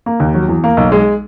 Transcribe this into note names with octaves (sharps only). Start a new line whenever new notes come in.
A#3
D#2
F#3
E2
A#3
B1
G#3